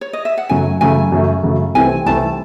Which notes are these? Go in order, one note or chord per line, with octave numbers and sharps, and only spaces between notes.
C#5
D#5
E5
F#5
F#2 C#3 F#3 A3 G#5
F#2 C#3 F#3 A3 G#5
F#2 C#3 F#3 A3
F#2 C#3 F#3 A3
C2 C3 E3 A3 C4 G#5
C2 C3 E3 A3 C4 A5